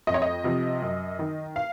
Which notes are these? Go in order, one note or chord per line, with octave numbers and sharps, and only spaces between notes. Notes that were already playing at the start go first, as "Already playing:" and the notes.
F2 D#5
C#5
D#5
C3 F3
F#2
D#3
F5